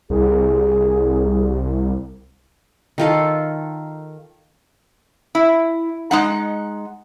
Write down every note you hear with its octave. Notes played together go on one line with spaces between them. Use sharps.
C2 G#4
D#3 F4 A4
E4
G#3 D#4 F#5